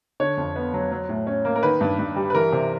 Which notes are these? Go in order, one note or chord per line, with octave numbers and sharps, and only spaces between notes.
D3 C#5
F2
B3
F#3
F#3
A2
C#4
A#3
A#4
D#3 B4
G2
G2
G3
B4
E3 A#4
C3